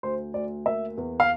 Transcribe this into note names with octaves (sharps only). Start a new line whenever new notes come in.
D2 C5
D2 D5
A#3 E5
E2
F5